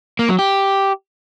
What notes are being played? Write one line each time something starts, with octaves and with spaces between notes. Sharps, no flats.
A#3
F#3
G4